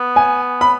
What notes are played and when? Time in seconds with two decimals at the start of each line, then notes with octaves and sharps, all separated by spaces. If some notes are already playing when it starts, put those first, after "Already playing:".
Already playing: B3
0.16 G#5
0.61 B5